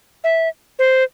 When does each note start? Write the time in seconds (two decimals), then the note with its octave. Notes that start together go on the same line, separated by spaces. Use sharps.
0.24 E5
0.79 C5